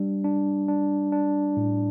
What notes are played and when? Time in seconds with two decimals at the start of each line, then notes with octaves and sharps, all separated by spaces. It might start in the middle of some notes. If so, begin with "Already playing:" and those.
Already playing: G3 D4
0.24 D4
0.68 D4
1.12 D4
1.57 A2